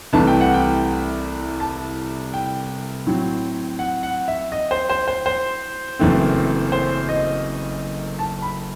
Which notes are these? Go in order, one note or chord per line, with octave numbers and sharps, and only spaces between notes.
C2 C3 E3 A3 A5
G5
F#5
G5
A5
G5
A2 F#3 C4
F#5
F#5
E5
D#5
C5
C5
C5
C5
F#1 F#2 E3 A3 C4
C5
D#5
A5
B5